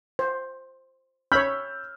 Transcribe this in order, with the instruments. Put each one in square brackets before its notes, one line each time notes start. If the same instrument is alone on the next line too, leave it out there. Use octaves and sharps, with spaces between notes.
[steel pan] C5
[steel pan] C#5 B5 [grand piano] E6 F6 G6